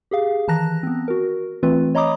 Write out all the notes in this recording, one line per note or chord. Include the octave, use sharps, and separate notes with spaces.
G4 G#4 F5
D#3 E3 A5 A#5 F#6 A#6
B3 C4
F#4 A#4
E3 A3 C4 F4 B4
C#5 D#5 A#5 B5 D6 D#6